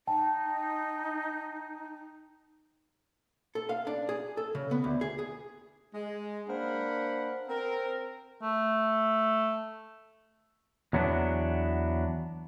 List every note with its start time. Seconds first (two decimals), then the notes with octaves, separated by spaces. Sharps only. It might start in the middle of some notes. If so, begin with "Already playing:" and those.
0.07 D#4 G5 A5
3.55 A4
3.69 F5
3.87 D4
4.09 G#4
4.37 A4
4.55 C#3
4.71 B3
4.84 D2
5.01 G#4
5.19 G#4
5.94 G#3
6.48 A#3 D4 A#4 C5 F#5 B5
7.48 C4 A#4
8.42 A3
10.93 E2 F#3 B3 D4